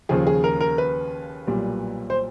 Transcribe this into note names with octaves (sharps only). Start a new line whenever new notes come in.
D#2 C#3 F3 G#4
G#4
A#4
A#4
B4
B1 A#2 G3
C5